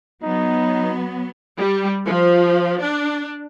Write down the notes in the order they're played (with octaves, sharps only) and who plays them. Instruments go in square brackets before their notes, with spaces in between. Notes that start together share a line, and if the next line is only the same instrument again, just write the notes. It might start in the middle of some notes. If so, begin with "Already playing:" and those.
[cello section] F#3 B3 [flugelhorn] D#4
[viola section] G3
F3
D4